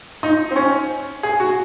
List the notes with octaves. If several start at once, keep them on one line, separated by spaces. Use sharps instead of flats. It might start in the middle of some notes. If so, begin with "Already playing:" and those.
D#4
C4
C#4
G#4
F#4